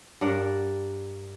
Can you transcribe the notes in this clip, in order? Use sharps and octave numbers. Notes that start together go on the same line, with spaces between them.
G2 D4 A#4 F#5